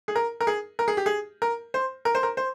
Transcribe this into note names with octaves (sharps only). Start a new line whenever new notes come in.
G#4
A#4
A#4
G#4
A#4
G#4
G4
G#4
A#4
C5
A#4
C5
A#4
C5